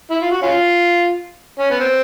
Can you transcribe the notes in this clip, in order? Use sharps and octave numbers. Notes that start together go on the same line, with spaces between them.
E4
F4
F#4
C#4 F4
C#4
B3
C4